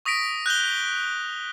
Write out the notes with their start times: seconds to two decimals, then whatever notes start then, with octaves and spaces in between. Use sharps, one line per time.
0.05 C#6 D#6 A#6 B6 D7
0.46 F#6 G6 F7 G7